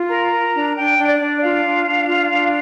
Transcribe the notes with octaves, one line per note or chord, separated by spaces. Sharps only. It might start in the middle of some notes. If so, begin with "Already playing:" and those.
Already playing: F4
A#4 A#5
A#4
D4
D4 G5
D4
D5
D4
F4 F5
D4
D4
F4
D4